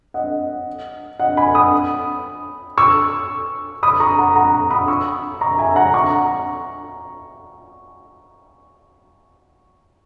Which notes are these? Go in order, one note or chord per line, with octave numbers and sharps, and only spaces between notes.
D#5 F#5
D#5 F#5
G#5 B5
B5 D#6
C#6 E6
B5 D#6
A#5 C#6
F#5 A#5
F#5 A#5
B5 D#6
C#6 E6
A#5 C#6
E5 G#5
F#5 A#5
A#5 C#6